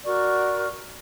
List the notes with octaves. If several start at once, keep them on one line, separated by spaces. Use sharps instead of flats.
F#4 A#4 D5 C#6